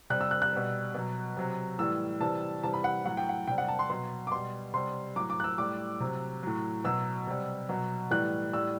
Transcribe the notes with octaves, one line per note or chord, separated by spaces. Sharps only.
C3 G3 F#6
E6
F#6
F#6
B2 G3
B2 F#3
C3 F#3
A2 E3 G3 E6
C3 E3 G3 A5
C3 E3 G3 A5
B5
F#5
A2 F#3 F#5
G5
F#5
C3 G3 G5
F#5
A5
C6
B2 F#3 C6
D6
B2 G3 C6
C3 G3 C6
A2 F#3 D6
D6
F#6
E6
A2 G3 D6
C3 F#3
A2 F#3
B2 F#3 E6
C3 G3
B2 F#3
A2 E3 G3 F#6
A2 G3 E6